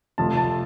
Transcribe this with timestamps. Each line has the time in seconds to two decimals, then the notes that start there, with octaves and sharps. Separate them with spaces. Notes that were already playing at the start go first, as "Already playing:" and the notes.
0.18 F1 F2 C3 A5
0.37 A5